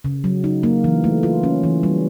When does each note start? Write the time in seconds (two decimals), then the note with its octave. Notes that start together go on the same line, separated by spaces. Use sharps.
0.04 C#3
0.24 F#3
0.44 D#4
0.63 A#3
0.84 E3
1.04 A3
1.23 F4
1.43 C#4
1.64 E3
1.83 G3